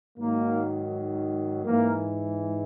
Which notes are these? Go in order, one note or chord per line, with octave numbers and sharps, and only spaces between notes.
G#2 D#3 F#3 A#3
G#2 E3 A#3